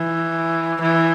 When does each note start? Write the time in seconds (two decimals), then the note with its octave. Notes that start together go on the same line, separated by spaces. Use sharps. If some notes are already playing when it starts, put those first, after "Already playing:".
Already playing: E3
0.81 E3